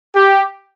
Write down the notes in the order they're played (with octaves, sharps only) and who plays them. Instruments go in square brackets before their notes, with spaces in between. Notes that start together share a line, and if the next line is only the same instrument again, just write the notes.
[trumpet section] G4